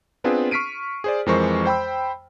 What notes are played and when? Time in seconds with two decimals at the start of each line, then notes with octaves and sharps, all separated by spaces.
0.24 B3 C4 D4 F4 G#4 B4
0.51 C#6 F6 B6 C7 D7 D#7
1.04 G#4 C5 D5
1.26 F2 E3 G#3 A#4 C5 C#6
1.65 C5 G5 B5 E6